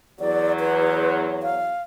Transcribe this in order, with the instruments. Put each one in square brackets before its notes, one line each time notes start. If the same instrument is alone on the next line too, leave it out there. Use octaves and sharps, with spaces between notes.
[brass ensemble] E2 F#3 [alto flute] D5
[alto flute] B4
F5